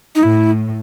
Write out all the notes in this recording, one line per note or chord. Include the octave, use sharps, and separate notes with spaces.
D#4
A2 E4